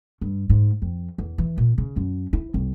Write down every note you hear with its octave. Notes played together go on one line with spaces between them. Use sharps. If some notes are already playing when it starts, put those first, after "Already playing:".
G2
G#2
F2
E2
E3
A#2
C#3
F#2
E4
C2